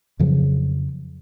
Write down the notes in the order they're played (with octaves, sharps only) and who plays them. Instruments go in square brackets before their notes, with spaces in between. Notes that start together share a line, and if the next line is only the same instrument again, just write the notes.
[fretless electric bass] F2 C#3 F3 F#3